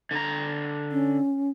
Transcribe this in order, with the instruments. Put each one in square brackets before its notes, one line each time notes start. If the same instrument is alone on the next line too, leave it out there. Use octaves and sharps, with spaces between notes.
[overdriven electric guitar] D3 A#5
[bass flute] C#4